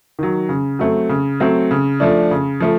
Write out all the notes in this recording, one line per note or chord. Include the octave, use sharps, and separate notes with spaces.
D#3 F#3
C#3
F#3 A3 C4
C#3
F#3 A3 C4
C#3
F3 A3 D4
C#3
F3 A3